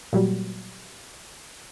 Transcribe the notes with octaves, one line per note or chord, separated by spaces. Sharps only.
A#2 F#3 G3